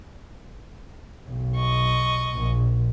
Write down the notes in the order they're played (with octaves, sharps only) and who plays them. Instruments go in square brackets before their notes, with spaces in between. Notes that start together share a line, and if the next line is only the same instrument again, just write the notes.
[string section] B1
[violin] D#5 C#6
[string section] A#1